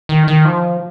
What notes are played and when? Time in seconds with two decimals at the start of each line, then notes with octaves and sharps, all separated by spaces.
0.09 D#3
0.28 D#3
0.45 F3